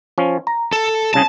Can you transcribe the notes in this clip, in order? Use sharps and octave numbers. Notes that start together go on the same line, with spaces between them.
F3 C#4
A#5
A4
C2 C#3 G#4 A5